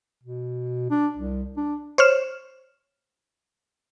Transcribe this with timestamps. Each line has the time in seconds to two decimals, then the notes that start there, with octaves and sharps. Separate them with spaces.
0.23 B2
0.90 D4
1.17 C2
1.57 D4
1.98 C5 C#5 F6 E7